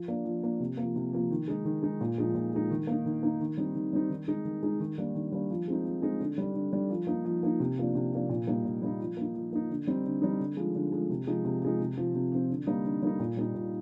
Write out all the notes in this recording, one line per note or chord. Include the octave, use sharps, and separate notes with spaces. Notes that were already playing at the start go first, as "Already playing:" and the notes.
Already playing: F3
A#3 D4
F3
A#3 D4
C3
F3 A#3
C3
F3 A#3
D#3
G#3 D#4
D#3
G#3 D#4
A#2
F3 G#3 D#4
A#2
F3 G#3 D#4
D#3
A#3 D#4
D#3
A#3 D#4
D#3
G3 C4 D#4
D#3
G3 C4 D#4
D#3
G#3 D#4
D#3
G#3 D#4
D#3
G3 A#3 D4
D#3
G3 A#3 D4
F3
G#3 C4 D#4
F3
G#3 C4 D#4
D3
G3 D4
D3
G3 D4
F3
A#3 D#4
F3
A#3 D#4
C3
F3 A#3 D4
C3
F3 A#3 D4
A#2
G3 A#3 D#4
A#2
G3 A#3 D#4
F3
A#3 D#4
F3
A#3 D#4
D3
G3 C4 D#4
D3
G3 C4 D#4
D3
F3 G#3
D3
F3 G#3
C3
F3 G#3 D#4
C3
F3 G#3 D#4
C3
F3 C4
C3
F3 C4
D3
G3 A#3 D#4
D3
G3 A#3 D#4
A#2
G3 A#3 D#4
A#2